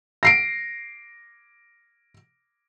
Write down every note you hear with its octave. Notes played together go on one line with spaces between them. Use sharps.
A#6 C7 D7